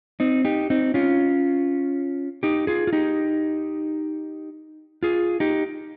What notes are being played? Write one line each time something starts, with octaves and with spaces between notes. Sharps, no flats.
C4 D#4
D#4 G4
C4 D#4
C#4 F4
D#4 G4
F4 G#4
F4
D#4 G4
F4 G#4
D#4 G4